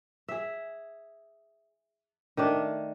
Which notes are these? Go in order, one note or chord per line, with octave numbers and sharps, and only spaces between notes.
G#4 E5
D#3 A3 D4